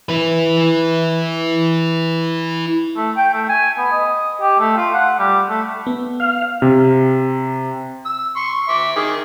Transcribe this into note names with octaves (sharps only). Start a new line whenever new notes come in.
E4 B4
A3
G5
A3
G#5
B3
D#5
G4
A3
F4
F#5
G3
A3
B3
F5
C3
E6
C6 C#6
E5 D6
D#3 G#4